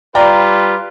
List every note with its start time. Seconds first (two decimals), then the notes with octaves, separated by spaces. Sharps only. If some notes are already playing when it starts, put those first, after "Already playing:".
0.15 G3 F4 B4 D5 G5 A#5